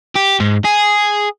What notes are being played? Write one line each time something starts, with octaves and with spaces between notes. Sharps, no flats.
G4
G#2
G#4